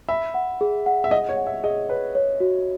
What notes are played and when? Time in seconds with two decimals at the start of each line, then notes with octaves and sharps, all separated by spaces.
0.09 E5 B5
0.34 F#5
0.61 G#4
0.86 F#5
1.04 E5
1.11 D#5 F#5
1.29 C#5
1.37 F#5
1.47 E5
1.64 G#4 D#5
1.89 B4 C#5
2.15 C#5
2.40 F#4